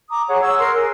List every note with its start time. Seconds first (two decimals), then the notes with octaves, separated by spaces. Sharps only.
0.10 A#5 D6 D#6
0.28 G#4 C#5 F#5
0.41 E6
0.57 A#4 C6 E6 F#6
0.76 G#4